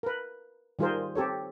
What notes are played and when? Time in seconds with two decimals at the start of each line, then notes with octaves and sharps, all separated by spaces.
0.03 A#4 B4
0.79 D#3 G3 F4 G#4 A#4 C5
1.15 C4 G4 A4 C#5